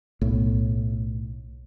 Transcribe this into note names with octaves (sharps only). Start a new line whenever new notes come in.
B1 A2